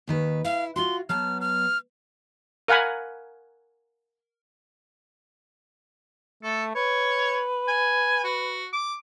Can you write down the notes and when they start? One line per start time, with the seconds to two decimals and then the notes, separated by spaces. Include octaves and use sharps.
0.07 D#2 D#3 B4
0.45 E4 F5
0.76 F4 F#4 C6
1.09 F#3 B3 A5 F6
1.41 F6
2.68 A#4 F5 F#5 G#5 B5
6.43 A3 A4
6.75 B4 C#5
7.68 G#5
8.24 F#4
8.73 D6